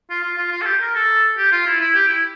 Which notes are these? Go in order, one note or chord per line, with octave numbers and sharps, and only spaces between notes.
F4
F4
F4
F4
A4
G4
A#4
A4
G4
F4
E4
E4
G4
E4